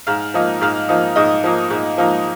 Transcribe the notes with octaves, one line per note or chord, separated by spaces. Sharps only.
G#2 F5
F3 A#3 D#4
G#2 F5
F3 A#3 D#4
G#2 D#5
F3 A#3 D#4
G#2
F3 A#3 D#4